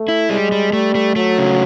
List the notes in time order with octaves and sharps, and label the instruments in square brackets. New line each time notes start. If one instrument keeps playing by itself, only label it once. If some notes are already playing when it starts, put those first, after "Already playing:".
Already playing: [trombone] A3
[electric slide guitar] E4
[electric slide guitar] G3 [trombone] G#3
[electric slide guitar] G3
[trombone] G3 [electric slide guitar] A3
[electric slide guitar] A3
[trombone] F#3 [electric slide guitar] A3
[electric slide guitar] C#3